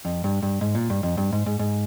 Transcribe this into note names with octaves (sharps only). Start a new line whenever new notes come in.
F2
G2
G2
G#2
A#2
G2
F2
G2
G#2
G#2
G#2